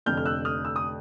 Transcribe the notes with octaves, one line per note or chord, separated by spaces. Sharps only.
F1 F2 D3 F6 G6
F6
E6 F#6
D#6 F6
E6
D#6